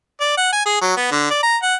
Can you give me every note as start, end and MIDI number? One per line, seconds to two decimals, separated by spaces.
0.20 0.33 74
0.37 0.50 78
0.52 0.65 80
0.66 0.77 68
0.82 0.94 54
0.97 1.07 59
1.11 1.26 50
1.30 1.42 74
1.43 1.57 82
1.62 1.75 78